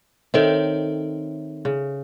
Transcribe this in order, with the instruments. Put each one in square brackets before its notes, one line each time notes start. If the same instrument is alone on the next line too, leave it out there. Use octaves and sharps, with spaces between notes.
[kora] D#3 C4 [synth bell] A4 C#5 E5
[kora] C#3